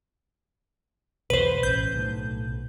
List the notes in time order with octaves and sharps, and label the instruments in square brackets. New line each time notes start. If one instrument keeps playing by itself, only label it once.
[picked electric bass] B1 E2 [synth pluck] B4 C5
[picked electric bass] A1 [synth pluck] G6
[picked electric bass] B1 A2